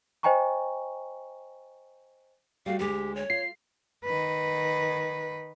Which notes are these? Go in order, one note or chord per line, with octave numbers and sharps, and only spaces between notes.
C5 D#5 G5 G#5 A#5 C#6
G3 A3 F#4 F5
D2 G#3 G4
C#5
F4 C7
D#3 B4